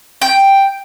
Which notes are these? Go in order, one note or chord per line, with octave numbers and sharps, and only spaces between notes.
G5